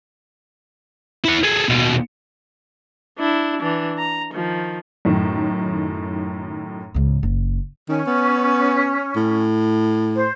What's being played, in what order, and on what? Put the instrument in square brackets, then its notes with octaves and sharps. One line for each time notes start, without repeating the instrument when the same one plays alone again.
[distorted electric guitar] E4 F#5
G#4 A4
D#2 B2
[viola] D4 E4
E3 D4
A#5
D#3 F3
[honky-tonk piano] F#2 A2 D#3
[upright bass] C#2 G#2
F#1
[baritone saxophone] D#3 [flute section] C#4
[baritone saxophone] B3
A2
[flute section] C5